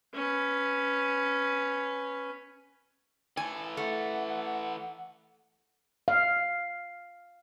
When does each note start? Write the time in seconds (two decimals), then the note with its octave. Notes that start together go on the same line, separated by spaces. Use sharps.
0.14 C#4 B4
3.37 E3 A4 G#5
3.77 A3 F#5
6.08 F5